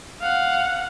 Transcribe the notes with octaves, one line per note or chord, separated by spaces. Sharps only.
F5 F#5